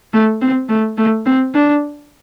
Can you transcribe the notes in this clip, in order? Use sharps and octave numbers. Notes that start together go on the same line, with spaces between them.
A3
C4
A3
A3
C4
D4